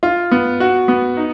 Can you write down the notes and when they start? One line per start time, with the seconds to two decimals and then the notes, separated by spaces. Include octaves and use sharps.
0.03 F4
0.31 B3
0.60 F#4
0.88 B3
1.17 D#4